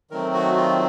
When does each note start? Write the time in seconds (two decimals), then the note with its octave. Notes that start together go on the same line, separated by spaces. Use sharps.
0.10 D#3 F#3 A3 C4 A#4
0.34 F#4
0.57 F4